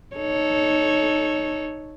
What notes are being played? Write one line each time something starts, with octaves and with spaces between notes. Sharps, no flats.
D#4 A4 C#5